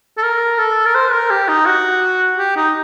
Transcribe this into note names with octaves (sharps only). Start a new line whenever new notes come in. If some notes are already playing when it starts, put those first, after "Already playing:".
A4
A#4
A4
A#4
C5
A#4
G4
D#4
F#4
G4
D#4